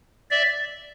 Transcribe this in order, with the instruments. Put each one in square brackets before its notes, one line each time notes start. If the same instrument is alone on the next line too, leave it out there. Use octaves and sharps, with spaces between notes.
[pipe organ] D5 E5